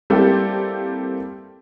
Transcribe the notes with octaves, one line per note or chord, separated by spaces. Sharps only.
G3 A#3 C4 E4 G4 A4